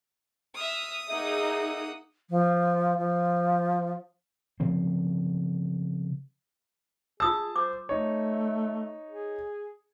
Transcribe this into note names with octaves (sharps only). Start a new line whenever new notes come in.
E5 D#6 F6
A#3 D#4 G#4 E5 F#5
F3
F3
C#3 F3 F#3 C4
F4 G#4 A5 D#6 E6
C5 D6
A3 D#4 C#5
G#4